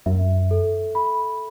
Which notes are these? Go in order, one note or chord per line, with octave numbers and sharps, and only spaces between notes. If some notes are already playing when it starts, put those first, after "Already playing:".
F#2 E5
A4
B5